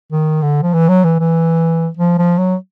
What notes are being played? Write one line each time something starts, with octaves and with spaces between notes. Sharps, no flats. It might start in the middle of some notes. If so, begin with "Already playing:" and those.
D#3
D3
F3
E3
F#3
E3
E3
F3
F3
F#3